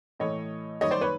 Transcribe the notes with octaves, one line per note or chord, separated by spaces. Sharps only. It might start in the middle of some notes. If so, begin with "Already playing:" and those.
A2 E3 A3 C#5 D#5
F#2 D#3 G3 A#3 C#5 D#5
C5 D5
B4 C#5